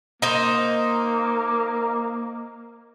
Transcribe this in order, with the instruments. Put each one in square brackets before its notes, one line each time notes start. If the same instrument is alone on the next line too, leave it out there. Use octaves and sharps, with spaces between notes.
[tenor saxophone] A#3 [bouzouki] D#4 C5